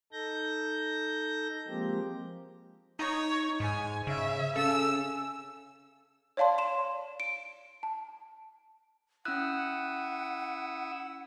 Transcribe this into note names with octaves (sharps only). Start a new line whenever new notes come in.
D#4 A4 G6 A#6
F3 G#3 A#3 C4 G4
D#4 C#5
G#2 G#5
C#3 E5
C#3 C#4 A4 E6
C#5 D5 F5 A5 C6
C6 E7
D7
A5
C#4 E4 F#5 D#6 E6 F#6